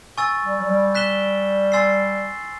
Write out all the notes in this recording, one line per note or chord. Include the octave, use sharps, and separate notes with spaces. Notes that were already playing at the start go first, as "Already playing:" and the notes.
G#5 C#6 E6 A6
G3
F#3
G3
F#6 B6 E7 G7
G#5 C6 E6 A6 C7